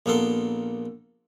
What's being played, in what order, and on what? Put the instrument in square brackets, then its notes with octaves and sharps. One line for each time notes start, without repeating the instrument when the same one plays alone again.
[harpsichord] A#1 A#3 B3 A4 C6